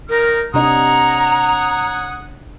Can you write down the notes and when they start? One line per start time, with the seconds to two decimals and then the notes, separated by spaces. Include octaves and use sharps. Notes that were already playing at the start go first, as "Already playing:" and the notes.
0.09 D#3 A#4 F6
0.54 C3 D4 C#5 D#5 F#5 A#5 D#6